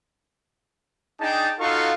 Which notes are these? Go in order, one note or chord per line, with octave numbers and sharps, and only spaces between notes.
D4 D#4 G#4 G5 A5
D#4 F4 F#4 A4 F5 C#6